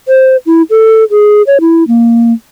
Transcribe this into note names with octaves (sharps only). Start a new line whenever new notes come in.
C5
E4
A4
G#4
C#5
E4
A#3